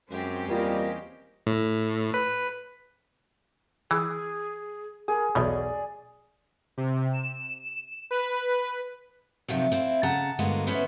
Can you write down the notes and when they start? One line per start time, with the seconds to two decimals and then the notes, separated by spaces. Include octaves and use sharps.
0.10 F#2 G#3 C4 C#4 G4 C5
0.49 E2 G3 A#3 C4 F4 D#5
1.47 A2
2.14 B4
3.91 E3 G#4
5.08 G#4 A#4
5.35 B1 E2 B2 D5
6.78 C3
7.13 E7
8.11 B4
9.48 C3 D#3 F3 F#3
9.72 C4 E4 F4
10.03 C#3 F#5 A5 A#5
10.39 G2 D3 G#3 A#3 B3 F#4
10.67 B3 C#4 E4 B4 C5 E5